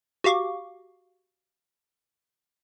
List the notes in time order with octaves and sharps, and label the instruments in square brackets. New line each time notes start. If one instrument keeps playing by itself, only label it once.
[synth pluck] F#4 G4 F5 C#6 D6